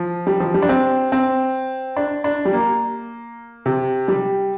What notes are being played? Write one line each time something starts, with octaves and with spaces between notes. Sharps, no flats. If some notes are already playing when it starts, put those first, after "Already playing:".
Already playing: F3
G3
F3
G3
D4
C4
C4
D4
D4
G3
A#3
C3
G3